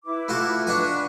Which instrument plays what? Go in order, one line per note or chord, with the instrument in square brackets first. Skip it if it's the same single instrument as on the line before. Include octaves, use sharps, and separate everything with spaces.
[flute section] E4 B4 D6
[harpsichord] A3 F4 F#4
[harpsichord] D4 F#5 G#5 [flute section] B4 C#6